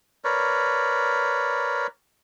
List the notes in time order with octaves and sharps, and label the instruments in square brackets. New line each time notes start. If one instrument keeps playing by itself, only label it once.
[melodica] A#4 B4 C#5 D5